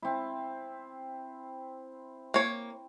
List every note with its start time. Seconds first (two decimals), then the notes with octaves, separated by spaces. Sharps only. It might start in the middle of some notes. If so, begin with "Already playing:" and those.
0.02 C4 E4
2.34 A#3 C#5